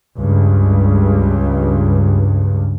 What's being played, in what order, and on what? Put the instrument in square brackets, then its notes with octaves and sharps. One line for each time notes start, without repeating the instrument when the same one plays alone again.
[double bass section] C#2 G2